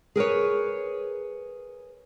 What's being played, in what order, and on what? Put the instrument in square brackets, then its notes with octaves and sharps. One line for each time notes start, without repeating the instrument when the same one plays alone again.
[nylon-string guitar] G#4 A#4 B4 C#5